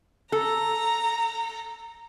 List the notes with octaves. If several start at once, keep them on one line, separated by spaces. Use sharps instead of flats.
A4 A#5